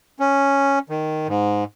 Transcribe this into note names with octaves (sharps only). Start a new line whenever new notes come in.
C#4
D#3
G#2